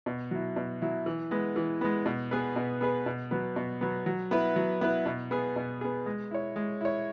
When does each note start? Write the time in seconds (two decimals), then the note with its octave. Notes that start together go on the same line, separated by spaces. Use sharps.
0.06 B2
0.31 F#3 E4
0.56 B2
0.82 F#3 E4
1.06 E3
1.31 G#3 B3
1.56 E3
1.81 G#3 B3
2.06 B2
2.31 B3 G#4 B4
2.56 B2
2.81 B3 G#4 B4
3.06 B2
3.31 F#3 B3
3.56 B2
3.81 F#3 B3
4.06 F#3
4.31 B3 E4 B4
4.56 F#3
4.81 B3 E4 B4
5.06 B2
5.31 B3 G#4
5.56 B2
5.81 B3 G#4
6.06 G#3
6.31 E4 C#5
6.56 G#3
6.81 E4 C#5